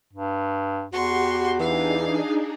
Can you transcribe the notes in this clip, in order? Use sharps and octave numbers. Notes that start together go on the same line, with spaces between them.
G2
E2 F#4 G4 C6 C#6
E3 D4 D#4 G#4 F5